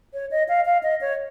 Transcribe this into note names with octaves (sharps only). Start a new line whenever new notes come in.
C#5
D#5
F5
F5
D#5
C#5